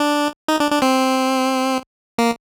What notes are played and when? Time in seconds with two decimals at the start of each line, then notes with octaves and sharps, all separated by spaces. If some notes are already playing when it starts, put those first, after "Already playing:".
Already playing: D4
0.48 D#4
0.60 D4
0.71 D4
0.82 C4
2.18 A#3